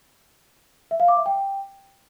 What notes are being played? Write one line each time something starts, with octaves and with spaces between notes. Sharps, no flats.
E5
F5
D6
E5
G5